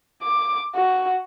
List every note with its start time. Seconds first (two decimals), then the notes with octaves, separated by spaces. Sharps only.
0.23 D6
0.75 F#4